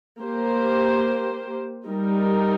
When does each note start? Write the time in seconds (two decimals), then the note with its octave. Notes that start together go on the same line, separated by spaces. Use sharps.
0.21 A#3 G4 C5
1.86 G3 D#4 A#4